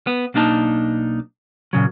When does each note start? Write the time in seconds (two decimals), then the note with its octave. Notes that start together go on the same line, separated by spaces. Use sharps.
0.07 B3
0.34 B1 A#3 D4 D#4 A5
1.73 A#2 C#3 F#3